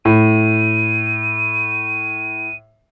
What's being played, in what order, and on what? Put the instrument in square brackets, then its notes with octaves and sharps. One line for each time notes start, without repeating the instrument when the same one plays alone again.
[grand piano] A2 [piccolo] D#7